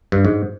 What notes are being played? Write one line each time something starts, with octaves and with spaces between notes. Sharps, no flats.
G2
G#2